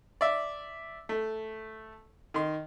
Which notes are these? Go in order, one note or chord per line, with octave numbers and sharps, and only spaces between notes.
D5 E5
A3
D#3 C6